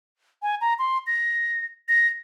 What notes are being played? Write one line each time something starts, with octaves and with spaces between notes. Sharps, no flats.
G#5
A#5
C6
A#6
A#6